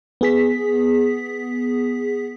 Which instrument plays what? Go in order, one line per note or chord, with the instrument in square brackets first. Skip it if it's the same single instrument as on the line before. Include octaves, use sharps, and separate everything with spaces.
[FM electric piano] B3 G#4 B6